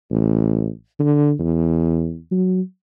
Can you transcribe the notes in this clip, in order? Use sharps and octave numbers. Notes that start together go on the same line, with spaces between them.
A1
D3
E2
F#3